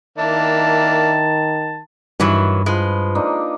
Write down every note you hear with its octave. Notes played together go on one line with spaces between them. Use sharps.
D#3 A#3 D4 E4 A5
G2 D#3 E3 F#3
F3 G#3 B4
A#3 D4 D#4